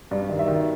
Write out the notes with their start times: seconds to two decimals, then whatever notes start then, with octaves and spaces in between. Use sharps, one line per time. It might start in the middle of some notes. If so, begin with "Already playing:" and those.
0.11 G2 D5
0.29 D#3
0.39 E5
0.48 D#3